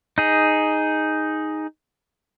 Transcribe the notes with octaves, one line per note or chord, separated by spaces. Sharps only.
D#4 G#4